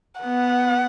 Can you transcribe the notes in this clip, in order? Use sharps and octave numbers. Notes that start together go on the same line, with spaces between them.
B3 F#5